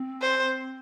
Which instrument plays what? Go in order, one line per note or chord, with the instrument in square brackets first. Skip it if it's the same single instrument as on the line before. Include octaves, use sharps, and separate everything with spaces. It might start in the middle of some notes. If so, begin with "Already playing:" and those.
Already playing: [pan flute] C4
[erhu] C5